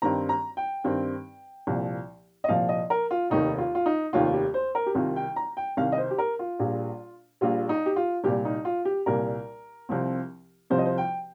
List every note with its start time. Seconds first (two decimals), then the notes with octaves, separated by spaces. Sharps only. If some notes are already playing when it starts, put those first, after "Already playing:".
0.02 G2 D#3 C4 A#5
0.29 A#5
0.57 G5
0.84 G2 D#3 C4
1.67 C2 A#2 F3
2.44 D#5
2.49 C2 A#2 F3 F5
2.69 D#5
2.90 A#4
3.11 F4
3.30 F1 D#2 D#3 D#4
3.58 F4
3.75 F4
3.86 D#4
4.13 F1 D#2 D#3 F4
4.34 G4
4.54 C5
4.75 A#4
4.86 G4
4.95 C2 C3 D#3 F4
5.16 G5
5.36 A#5
5.57 G5
5.77 C2 C3 D#3 F5
5.92 D#5
5.98 C5
6.11 G4
6.18 A#4
6.39 F4
6.59 A#1 A#2 G3
7.41 A#1 A#2 G3 F4
7.69 D#4
7.86 G4
7.96 F4
8.24 C2 A#2 G3 G4
8.45 D#4
8.65 F4
8.85 G4
9.06 C2 A#2 G3 A#4
9.89 C2 C3 F3 C4
10.70 C2 C3 F3 C4 C5
10.78 D#5
10.86 C5
10.98 G5